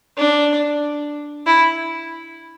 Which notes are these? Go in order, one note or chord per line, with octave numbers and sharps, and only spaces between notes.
D4
E4